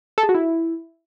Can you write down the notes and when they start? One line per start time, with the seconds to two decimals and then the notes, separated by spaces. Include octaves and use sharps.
0.18 A4
0.23 G#4
0.29 F#4
0.35 E4